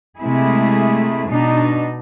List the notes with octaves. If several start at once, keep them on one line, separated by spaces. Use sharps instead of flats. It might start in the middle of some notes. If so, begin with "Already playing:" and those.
C3 G#3 A3 E4 G#4
B2 D4 D#4